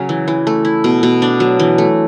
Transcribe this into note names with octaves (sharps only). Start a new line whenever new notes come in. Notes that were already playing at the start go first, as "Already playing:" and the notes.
Already playing: C#3 F#3 C#4
E3
E3
A3
E4
B2
B2
D4
F#3
E3
A3